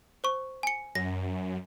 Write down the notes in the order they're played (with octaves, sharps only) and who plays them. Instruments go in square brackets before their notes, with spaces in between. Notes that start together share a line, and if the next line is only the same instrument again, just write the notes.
[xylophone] C5 C#6
G#5 C#7
[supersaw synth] F#2 [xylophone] A#6